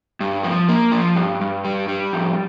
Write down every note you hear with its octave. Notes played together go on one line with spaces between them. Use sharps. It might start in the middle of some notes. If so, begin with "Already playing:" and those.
G2
F3
A#3
F3
G2
G2
G3
G3
F2